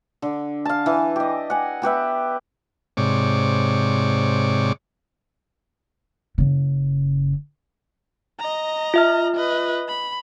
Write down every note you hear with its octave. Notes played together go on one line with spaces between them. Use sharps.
D3
F5 A5
E3
G4 D#5
F#5 G#5
B3 G4 B4 E5
G#2 C3 C#5 D5
F#1 C#3
D#5 A#5
F4 E5 F6
B4 D#5
B5